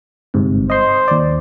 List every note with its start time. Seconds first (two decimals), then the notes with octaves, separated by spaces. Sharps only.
0.34 G1 G#2 C3
0.70 C5 D#5 C6
1.08 D#2 D5